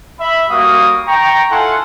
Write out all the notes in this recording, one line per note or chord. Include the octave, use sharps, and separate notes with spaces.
E5 B5
G3 A#3 F#4 F5 D#6
G5 A#5 C#6
E4 F4 A4 F#5 G#5 C6